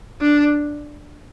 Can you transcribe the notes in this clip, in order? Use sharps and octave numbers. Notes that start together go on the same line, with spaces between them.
D4